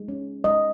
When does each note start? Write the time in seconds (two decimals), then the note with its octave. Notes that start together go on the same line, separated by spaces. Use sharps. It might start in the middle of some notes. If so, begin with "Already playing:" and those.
Already playing: G#3
0.08 C#4
0.44 G#3 D#5